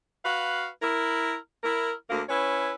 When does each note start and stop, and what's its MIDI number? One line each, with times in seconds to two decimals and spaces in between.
0.25 0.68 66
0.25 0.68 71
0.25 0.68 77
0.82 1.36 64
0.82 1.36 70
1.64 1.92 64
1.64 1.92 70
2.10 2.21 38
2.10 2.21 58
2.28 2.74 61
2.28 2.74 64
2.28 2.74 71
2.28 2.74 73